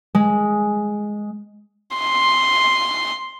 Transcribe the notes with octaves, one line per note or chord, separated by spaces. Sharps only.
G#3
C6